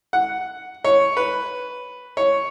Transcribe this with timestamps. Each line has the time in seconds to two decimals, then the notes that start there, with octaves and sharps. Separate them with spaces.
0.13 F#5
0.84 C#5
1.17 B4
2.17 C#5